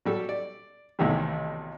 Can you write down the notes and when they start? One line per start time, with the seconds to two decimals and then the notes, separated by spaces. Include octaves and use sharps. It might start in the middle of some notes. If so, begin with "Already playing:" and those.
0.05 F#3 G3 A4
0.29 D5
0.99 B1 A2 C3 D#3 E3 G3